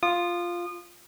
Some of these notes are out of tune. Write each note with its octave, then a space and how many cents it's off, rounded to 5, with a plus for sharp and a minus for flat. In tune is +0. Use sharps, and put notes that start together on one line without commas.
F4 +0 D#6 -30